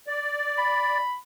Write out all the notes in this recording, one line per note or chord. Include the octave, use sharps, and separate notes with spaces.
D5
B5